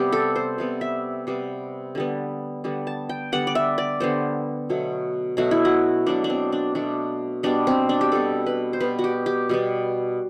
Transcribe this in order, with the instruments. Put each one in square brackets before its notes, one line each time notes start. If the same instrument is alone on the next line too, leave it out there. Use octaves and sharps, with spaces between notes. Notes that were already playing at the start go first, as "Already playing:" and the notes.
Already playing: [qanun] C3 G3 B3 G4
A4
C5
C3 G3 B3
E5
C3 G3 B3
D3 G3 B3
D3 G3 B3
A5
G5
D3 G3 B3 F#5
D5
E5
D5
D3 G3 B3 C5
B2 F#3 A3
B2 F#3 A3 F#4
E4
F#4
B2 F#3 A3 D4
D4
C4
D4
B2 F#3 A3 D4
B2 G3 B3 D4
C4
D4
G4
B2 G3 B3 A4
B4
C5
B2 G3 B3 B4
F#4
G4
G4
B2 G3 B3